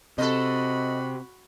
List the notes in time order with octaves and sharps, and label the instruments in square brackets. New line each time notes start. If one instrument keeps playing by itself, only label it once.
[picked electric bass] C3 [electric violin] F#4 B5 [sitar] A4 D#5